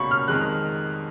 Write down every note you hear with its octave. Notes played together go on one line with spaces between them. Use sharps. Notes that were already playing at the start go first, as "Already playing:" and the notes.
Already playing: C#2 B2 A#3 C#4 B5 C#6
F6
F2 D#3 G#3 F#6